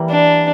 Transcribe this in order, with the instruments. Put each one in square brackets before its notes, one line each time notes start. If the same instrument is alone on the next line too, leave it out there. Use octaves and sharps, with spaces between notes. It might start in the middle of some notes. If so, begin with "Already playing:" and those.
Already playing: [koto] E3 G3 A#3
[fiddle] D4